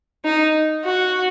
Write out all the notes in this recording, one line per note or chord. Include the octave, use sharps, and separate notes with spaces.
D#4
F#4